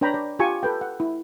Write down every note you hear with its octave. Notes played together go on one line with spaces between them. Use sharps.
D4 B4 C#5 G5 A#5 B5
D5
F4 G4 G#5 A5 C#6
A4 B4 G5
F#5
E4